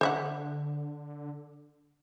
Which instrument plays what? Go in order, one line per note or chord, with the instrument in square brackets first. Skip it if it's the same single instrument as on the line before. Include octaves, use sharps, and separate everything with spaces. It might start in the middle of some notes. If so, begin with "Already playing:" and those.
[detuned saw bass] D3 [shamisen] C5 E5 F#5